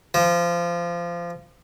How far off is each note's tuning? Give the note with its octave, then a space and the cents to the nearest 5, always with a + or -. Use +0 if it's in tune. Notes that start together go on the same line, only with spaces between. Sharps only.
F3 -20